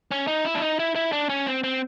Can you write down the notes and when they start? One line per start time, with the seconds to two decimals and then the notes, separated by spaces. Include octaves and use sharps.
0.11 C#4
0.27 D#4
0.45 E4
0.55 D4
0.61 D#4
0.79 E4
0.95 E4
1.12 D4
1.29 C#4
1.47 C4
1.64 C4